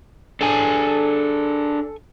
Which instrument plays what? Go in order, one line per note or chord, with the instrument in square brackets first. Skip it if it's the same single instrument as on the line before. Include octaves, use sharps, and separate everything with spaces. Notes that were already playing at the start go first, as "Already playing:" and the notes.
[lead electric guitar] D4 G#4 [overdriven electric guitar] A4 G#5